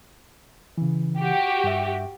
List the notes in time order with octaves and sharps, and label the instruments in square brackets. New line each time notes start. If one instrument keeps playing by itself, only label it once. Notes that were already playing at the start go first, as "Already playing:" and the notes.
[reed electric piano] C#3 E3
[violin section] F#4 G4
[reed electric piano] G2 E5